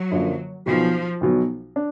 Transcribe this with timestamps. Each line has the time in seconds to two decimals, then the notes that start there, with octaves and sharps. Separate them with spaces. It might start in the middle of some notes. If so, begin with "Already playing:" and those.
Already playing: F#3
0.11 F#2 D3 F3 A#3
0.66 B1 B2 F3 F#3
1.21 B1 B2 F#3
1.76 D4